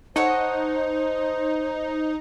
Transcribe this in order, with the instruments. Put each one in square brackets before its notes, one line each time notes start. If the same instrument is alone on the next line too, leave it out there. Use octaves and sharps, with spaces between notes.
[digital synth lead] D#4 [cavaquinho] A4 C#5 F#5 [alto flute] C5